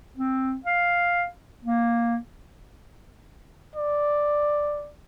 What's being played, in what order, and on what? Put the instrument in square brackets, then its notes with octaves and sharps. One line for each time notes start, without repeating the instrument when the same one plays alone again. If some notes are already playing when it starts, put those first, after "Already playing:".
[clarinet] C4
F5
A#3
[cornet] D5